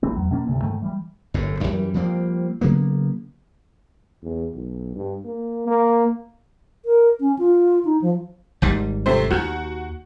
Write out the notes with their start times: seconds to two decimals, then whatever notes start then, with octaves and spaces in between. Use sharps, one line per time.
0.03 A1 E3 A3 C4
0.16 E2 F#3
0.31 B2 A#3 C#4 D4
0.47 D2 G2 C3
0.62 G#2 D#3 A3
0.82 E3 G3
1.34 G1 F#2 A2
1.60 F#2 E3 G3
1.94 F3 G3 A#3 C4
2.61 C#3 F#3 A#3 B3
4.22 E2
4.54 B1
4.96 G2
5.25 A#3
5.67 A#3
6.85 A#4
7.20 C#4
7.39 F4
7.85 D#4
8.02 F3
8.62 G#1 G#2 G3
9.06 C3 A3 C5
9.31 D#2 F#4